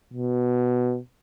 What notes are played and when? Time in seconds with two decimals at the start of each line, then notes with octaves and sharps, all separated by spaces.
0.13 B2